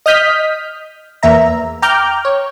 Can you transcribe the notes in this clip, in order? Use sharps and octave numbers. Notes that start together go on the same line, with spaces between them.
D#5 D#6 F6 G6 B6
E2 A#3 E5 A#5
G5 A#5 D6 F6 G6
C#5